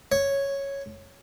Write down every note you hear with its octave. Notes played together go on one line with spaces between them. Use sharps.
C#5